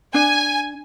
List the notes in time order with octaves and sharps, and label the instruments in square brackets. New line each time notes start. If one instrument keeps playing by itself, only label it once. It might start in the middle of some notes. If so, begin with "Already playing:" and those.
[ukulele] D4 [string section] G#5